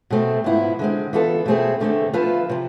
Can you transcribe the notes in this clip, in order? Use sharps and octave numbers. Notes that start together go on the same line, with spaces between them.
B2 A3 C4
G#2 F3 B3 E4
D3 G#3 C4
E3 B3 F4 A4
B2 A3 C4 G#4
E2 D3 A3 C4
F3 B3 F4 B4 E5
C3 F3